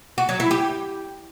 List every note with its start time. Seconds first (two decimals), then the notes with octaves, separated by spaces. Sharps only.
0.18 F#4
0.29 F#3
0.40 E4
0.51 G4